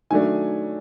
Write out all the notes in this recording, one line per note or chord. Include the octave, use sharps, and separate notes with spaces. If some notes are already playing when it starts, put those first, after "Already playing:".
D#3 F#3 A3 D4 G#5